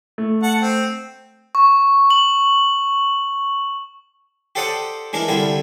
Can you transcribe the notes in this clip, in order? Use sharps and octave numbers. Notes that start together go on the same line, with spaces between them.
A3
F#5 A5
C4
C#6
F#7
G4 A4 C5 D5 F#5 D#6
E3 G#3 D4 A#4
C2 D3 G3 E4 F4